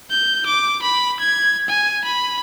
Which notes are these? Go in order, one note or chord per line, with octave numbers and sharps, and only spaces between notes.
G6
D6
B5
G#6
G#5
B5